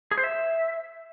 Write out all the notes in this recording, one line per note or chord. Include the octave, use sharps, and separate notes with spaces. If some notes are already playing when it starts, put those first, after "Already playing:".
G#4
C5
E5